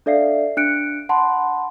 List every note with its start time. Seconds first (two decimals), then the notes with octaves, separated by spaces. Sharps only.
0.06 D4 A4 D5 E5 F5 C7
0.57 D4 F#6 C#7 D7
1.09 F#5 A5 B5 C6